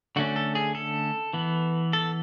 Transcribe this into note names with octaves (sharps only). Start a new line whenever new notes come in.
D3 A3 C#4 F#4
A4
G#4
A4
E3 B3
A4